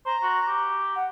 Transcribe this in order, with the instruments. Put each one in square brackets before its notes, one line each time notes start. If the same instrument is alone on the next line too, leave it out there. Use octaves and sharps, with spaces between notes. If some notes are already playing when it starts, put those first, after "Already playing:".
[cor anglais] C5 [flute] A#5
[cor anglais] F#4
G4
[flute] F#5